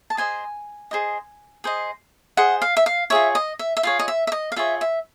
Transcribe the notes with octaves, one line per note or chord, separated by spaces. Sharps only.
A5
G#4 C5 D#5 G#5
G#4 C5 D#5
G#4 C5 D#5
G#4 C5 D#5 F#5
F5
E5
F5
F4 G#4 C#5 E5
D#5
E5
E5
F4 G#4 C#5 F5
D#5
E5
E5
D#5
F5
F4 G#4 C#5 E5
E5